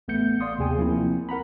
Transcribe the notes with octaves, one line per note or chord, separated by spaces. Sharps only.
A1 A3 B3 G6 C#7
D5 F5 C6 D#6
D#2 C3 G#4 G5 G#5
F3 A#3 C4 E4
A#4 F#5 A#5 B5